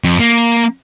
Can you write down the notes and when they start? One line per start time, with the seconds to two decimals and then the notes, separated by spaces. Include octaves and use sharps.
0.04 F2
0.20 A#3